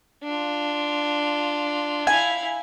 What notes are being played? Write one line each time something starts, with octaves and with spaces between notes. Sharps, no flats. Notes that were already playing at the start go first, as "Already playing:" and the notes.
D4 F4
E4 F5 G#5